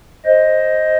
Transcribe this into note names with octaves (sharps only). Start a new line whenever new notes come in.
C5 D#5